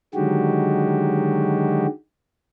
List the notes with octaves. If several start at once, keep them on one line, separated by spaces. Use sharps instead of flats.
D3 D#3 F#3 G#3 F#4 G4